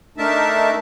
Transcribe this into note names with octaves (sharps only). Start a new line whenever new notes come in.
A3 D4 D#4 A#4 E5 A5